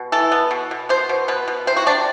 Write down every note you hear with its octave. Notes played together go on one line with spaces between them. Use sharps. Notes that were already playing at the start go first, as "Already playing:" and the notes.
Already playing: B2
E3 A4
B3
B2
B2
B2 C5
B2
B2 B4
B2
C3 C5
F#4
C3 D4